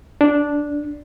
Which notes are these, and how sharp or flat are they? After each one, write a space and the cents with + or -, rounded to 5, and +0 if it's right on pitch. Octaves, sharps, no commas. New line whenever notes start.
D4 -5